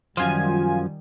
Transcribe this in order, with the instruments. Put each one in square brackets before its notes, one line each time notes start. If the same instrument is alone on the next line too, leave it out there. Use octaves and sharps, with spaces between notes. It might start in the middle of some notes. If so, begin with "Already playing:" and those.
[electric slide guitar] F#2 F3 [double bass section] D#3 G3 [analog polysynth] F4 G#5